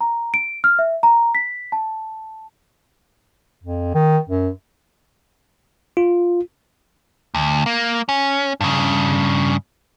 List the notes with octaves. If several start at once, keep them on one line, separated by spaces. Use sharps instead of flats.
A#5
D7
F6
E5
A#5
B6
A5
F2
D#3
F#2
F4
D2
A#3
C#4
G2 C#3